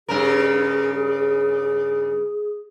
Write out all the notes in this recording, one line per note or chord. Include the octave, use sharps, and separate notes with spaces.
G2 C#3 G#4 A#4